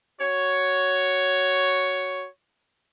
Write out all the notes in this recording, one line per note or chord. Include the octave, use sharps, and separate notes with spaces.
F#4 C#5